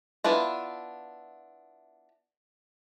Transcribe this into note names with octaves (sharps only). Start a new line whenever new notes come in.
B3 D4 E4 F4